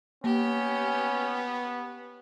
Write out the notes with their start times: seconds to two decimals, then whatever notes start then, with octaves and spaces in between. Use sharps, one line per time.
0.24 A#3 B3 C#4 G4